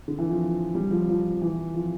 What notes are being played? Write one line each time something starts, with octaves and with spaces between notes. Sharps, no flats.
D3
E3
F3
G3
F3
F3
E3
F3